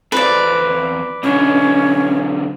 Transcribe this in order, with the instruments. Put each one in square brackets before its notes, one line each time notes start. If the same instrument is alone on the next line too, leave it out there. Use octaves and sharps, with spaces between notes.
[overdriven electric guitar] E2 C4 [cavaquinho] B4 D5
[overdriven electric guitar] B1 D3 [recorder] C#4